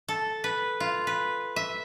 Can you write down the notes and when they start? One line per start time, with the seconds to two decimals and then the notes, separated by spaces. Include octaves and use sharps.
0.08 A4
0.44 B4
0.80 F4
1.07 B4
1.56 E5